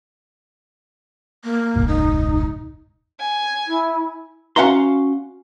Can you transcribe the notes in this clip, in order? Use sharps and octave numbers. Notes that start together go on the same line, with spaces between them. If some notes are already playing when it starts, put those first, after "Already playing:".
A#3
E1 C#2 G#2
D#4
G#5
E4
C#4 F#4 F5 F#5 A#5 C6